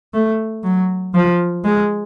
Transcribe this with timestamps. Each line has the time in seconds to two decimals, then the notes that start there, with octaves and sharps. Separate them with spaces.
0.14 A3
0.64 F#3
1.14 F3
1.64 G#3